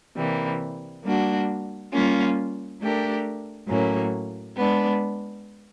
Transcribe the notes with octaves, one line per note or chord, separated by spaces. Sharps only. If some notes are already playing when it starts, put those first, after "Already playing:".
C3 E3 G3 A#3
G3 A#3 D4 F#4
G3 A#3 C#4 F4
A3 D4 G4 A#4
A2 F#3 A#3 C#4
G#3 B3 D4